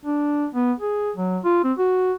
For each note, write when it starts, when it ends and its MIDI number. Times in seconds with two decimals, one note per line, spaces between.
0.05 0.46 62
0.54 0.72 59
0.80 1.11 68
1.16 1.38 54
1.44 1.63 65
1.64 1.73 60
1.78 2.12 66